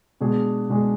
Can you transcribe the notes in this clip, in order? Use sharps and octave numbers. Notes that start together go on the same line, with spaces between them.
B2 G#3 D4 G#4
B2 G#3 D4 G#4